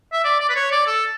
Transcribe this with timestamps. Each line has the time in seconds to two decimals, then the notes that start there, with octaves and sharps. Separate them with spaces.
0.13 E5
0.24 D5
0.40 D5
0.50 B4
0.56 C#5
0.72 D5
0.87 A4